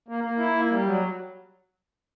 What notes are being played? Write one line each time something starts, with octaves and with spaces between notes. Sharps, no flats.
A#3
A#3
E4
A#3
G3
F#3